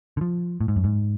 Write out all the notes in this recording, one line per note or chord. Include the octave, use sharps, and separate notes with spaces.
D3
F3
A2
G#2
F#2
G#2